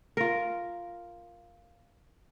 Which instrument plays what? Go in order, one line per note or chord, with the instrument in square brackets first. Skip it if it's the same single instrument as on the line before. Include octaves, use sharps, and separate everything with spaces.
[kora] F4 A#4